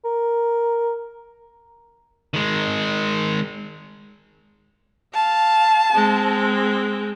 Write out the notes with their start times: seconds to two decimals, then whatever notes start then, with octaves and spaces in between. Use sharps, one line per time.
0.05 A#4
2.34 D#3 G#3
5.14 F5 A5
5.93 G#3 C4